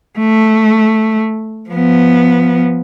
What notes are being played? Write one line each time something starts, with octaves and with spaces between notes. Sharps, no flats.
A3
F3 B3